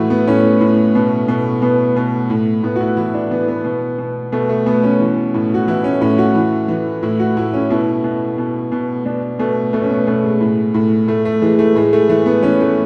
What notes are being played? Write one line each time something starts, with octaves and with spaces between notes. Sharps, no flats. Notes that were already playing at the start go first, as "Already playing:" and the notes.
Already playing: A2 E3 A3 E4 F#4
B3
A2 C#4
A2
B2
B2
B2 B3
B2
A2
A2 B3
F#4
E4
E3 E4
D4
E3 B3
B3
B2
B2
B2 A3
A3
B2 B3
C#4
E3
A2
F#4
E3 E4
C#4
A2 C#4
F#4
E3
E3
A2 E4
F#4
A2 E4
C#4
B2 E4
B2
B2
B2
B2 D4
B2 A3
B2 A3
C#4
B3
B2 A3
G#3
A2
A2
A2 A3
A3
E3 G#3
A3
A2 G#3
A3
E3 A3
B3
E3 C#4
A3